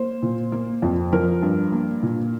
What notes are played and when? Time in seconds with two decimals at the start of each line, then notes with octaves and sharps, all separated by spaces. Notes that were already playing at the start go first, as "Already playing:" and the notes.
Already playing: A#3 C5
0.22 A#2
0.52 A#3
0.82 F2
1.12 F3 A#4
1.42 G2
1.72 A#3
2.03 A#2